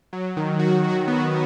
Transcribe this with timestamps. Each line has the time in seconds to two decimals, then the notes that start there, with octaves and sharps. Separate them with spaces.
0.13 F#3
0.37 D#3
0.59 F#4
0.84 F#4
1.08 B3